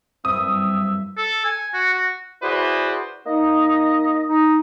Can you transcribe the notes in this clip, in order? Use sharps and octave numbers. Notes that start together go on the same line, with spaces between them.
F#1 G2 C4 E5 D#6
A4
G#5
F#4
F#4
E4 F#4 G#4 B4 C5 D5
A#3 D#4 D#5
D#4